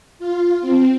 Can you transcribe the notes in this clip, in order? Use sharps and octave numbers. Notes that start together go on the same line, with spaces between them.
F4
C4